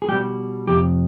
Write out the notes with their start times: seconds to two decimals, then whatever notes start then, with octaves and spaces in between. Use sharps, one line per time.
0.02 G#4
0.08 B2 G3 G4
0.67 F2 C3 G4